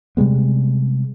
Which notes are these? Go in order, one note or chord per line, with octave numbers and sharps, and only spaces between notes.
C3 G3 G#3 B3